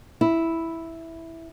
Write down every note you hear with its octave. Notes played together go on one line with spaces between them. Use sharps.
E4